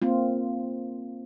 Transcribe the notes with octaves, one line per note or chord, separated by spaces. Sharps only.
A#3 C4 F4